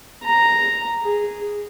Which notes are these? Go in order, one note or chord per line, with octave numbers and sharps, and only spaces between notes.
A#5
G#4